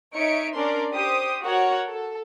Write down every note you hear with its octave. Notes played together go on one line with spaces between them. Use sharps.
D#4 C#5 E5 C#7 D7
C#4 D4 A#4 D5 C6
G4 C5 D#6
F#4 A#4 C#5 F#5
A4